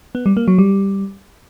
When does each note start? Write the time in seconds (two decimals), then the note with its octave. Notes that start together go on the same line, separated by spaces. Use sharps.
0.15 B3
0.26 G3
0.37 A#3
0.48 F#3
0.59 G3